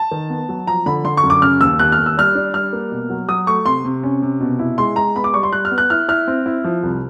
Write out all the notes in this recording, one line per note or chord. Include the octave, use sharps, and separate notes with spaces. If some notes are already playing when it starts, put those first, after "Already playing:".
Already playing: A5
D#3
B3
F#3
F3 A#5
D3 B5
D3 C6
C#6
F#2
D6
C#3 F6
D#2 E6
D#2 F#6
F6
D#2
E6
G3 F6
D4
G3 F6
A#3
B2
F#3
F#3 D#6
A3 C#6
C3 C6
C3
C#4
C3
B2
E4
G#3 C6
G#3 A#5
B3 B5
D6
G3 C#6
C6
G3 F#6
F6
B3
F#6
E4 F6
E4 F6
C4
E4
F3
C2